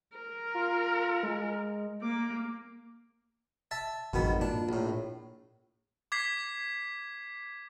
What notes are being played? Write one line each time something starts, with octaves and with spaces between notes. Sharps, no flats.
A#4
F4
G#3
A#3 D6
E5 A5
G#1 F2 G#2 B2 D#3 B3
A#2 D4
A#1 A2
D6 G#6 B6 C7